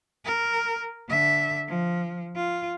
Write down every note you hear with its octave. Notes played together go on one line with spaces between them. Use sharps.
A#4
D3 E5
F3
F4